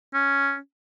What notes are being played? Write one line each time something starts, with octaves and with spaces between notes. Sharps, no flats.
C#4